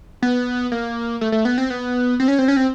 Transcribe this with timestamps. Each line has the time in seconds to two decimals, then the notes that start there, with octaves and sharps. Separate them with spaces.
0.22 B3
0.72 A#3
1.21 A3
1.32 A3
1.45 B3
1.58 C4
1.70 B3
2.20 C4
2.28 C#4
2.39 C4
2.48 C#4
2.57 C4